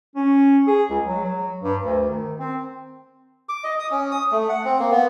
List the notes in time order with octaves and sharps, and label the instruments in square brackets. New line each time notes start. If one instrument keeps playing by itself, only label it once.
[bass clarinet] C#4
G#4
C#2
F#3
F#3
G2
D2
D#3
C4
[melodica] D6
D#5
D#6
C#4
D#6
A3
F#5
C4
A#3
B3